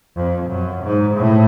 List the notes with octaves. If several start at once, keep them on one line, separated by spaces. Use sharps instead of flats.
F2
F#2
G#2
A2